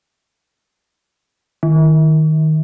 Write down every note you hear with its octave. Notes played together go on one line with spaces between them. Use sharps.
D#3